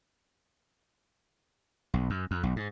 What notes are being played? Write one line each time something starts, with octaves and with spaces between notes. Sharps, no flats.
B1
F#2
F2
B1
G#2